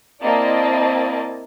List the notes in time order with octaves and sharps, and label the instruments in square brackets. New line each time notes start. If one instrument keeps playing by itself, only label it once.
[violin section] A#3 C4 E4 D5 D#5 A5